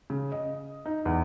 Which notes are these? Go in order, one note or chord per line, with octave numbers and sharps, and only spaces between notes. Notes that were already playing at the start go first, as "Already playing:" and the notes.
C#3
D#5
D#4
E2